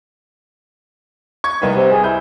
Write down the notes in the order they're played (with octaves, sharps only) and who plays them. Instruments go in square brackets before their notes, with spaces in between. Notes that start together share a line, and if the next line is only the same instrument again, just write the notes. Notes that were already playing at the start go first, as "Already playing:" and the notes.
[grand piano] C#6 G#6
[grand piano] C2 B4 [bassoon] D#3
[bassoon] C3
G#4
[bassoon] E4 [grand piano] G6